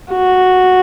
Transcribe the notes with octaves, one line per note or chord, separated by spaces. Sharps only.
F#4